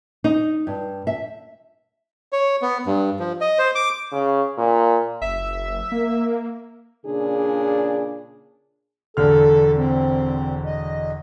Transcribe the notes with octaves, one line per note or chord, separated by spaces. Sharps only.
D#4
G2
E5
C#5
B3
G2
F3
D#5
C5
D6
C#3
A#2
F#1 E5
A#3
A#2 C#3 D4 G#4
E1 D3 A4 F6
C4
D#5